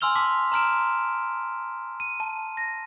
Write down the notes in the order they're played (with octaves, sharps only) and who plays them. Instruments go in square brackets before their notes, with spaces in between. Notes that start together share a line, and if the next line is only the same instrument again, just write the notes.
[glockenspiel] G#5 C6 E6 F6 F7 G7
A5 C6 D6 B6
A#5 C6 F6 D7 E7
D#7
A5
A#6